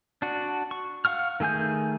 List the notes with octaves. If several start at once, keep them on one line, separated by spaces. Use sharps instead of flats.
D4 F#4
C#6
F5 F#5 C#6 F6
D#3 A3 G#4 G#5 G6